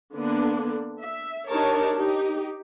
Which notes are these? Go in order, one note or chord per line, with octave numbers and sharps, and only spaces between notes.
D3 A#3 B3 D4
E5
D4 D#4 G4 A#4 C#5 A5
D#4 G4